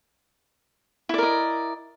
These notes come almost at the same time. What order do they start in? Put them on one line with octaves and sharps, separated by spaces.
E4 D5 A#4 D#5